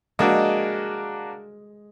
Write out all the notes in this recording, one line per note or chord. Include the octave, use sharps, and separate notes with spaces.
G#3 A#3 D4 F#4